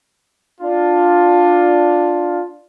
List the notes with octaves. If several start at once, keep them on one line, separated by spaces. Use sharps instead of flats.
D4 F4